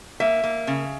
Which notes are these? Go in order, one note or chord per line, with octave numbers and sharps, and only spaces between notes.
A#3 E5
A#3
C#3